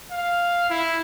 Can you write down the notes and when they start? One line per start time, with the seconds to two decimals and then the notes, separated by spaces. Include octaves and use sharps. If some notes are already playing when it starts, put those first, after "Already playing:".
0.11 F5
0.70 E4